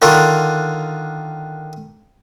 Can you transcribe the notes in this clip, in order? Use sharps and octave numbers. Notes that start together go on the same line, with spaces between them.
D3 D#3 D4 F4